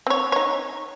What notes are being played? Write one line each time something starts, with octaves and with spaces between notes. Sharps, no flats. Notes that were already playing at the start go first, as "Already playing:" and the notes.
C4 C#5
D#4 C#5